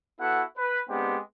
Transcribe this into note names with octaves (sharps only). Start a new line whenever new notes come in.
B3 E4 F#4 A4 F#5
B4
G#3 B3 C4 D4 G4